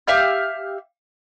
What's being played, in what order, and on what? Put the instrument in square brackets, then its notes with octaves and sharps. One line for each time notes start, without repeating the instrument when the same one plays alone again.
[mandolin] G4 E5 F5 G6